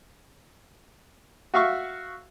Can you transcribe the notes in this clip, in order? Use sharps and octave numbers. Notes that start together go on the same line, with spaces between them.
F#4 E5 F5 C#6